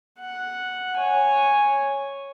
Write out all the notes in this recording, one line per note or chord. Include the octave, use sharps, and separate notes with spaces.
F#5
C#5 G#5